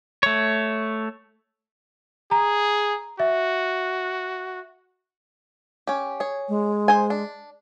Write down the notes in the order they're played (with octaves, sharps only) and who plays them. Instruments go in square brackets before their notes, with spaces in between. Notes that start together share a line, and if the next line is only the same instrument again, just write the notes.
[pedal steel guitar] A3 C#5
[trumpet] G#4 [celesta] A#5
[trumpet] F#4 [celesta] E5
[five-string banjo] C#4 G4
G#4 C#5
[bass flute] G#3
[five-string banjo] C5 G#5
D4